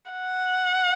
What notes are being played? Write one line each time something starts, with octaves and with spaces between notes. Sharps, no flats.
F#5